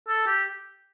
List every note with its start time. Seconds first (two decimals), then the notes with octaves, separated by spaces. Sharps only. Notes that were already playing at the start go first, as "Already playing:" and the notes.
0.08 A4
0.27 G4